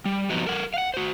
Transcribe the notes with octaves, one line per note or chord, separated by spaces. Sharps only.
G3
F3 G3 B3 D#4 F#4
A4 A#4 F#5
F5 F#5
F#4 C5